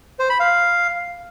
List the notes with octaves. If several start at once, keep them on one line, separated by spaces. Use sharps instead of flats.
C5
B5
F5